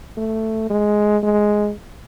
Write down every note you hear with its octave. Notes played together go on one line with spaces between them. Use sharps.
A3
G#3
G#3